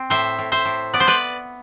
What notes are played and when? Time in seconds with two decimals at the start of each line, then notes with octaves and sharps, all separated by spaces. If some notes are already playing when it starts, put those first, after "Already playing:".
Already playing: C4
0.10 A2 C5 E5
0.39 A2
0.52 C5 E5
0.65 A2
0.93 B3 D5
1.00 C5
1.07 B4 D5